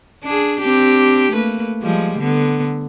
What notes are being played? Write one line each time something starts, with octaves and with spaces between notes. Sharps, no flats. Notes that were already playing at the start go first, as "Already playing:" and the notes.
D4 G#4
C4 D4 G4
A3 A#3 B4
F3 G3 G#3
D3 B3